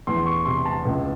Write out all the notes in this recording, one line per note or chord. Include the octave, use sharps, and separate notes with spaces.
E2 C6
C#6
C3 C6
A5
C#2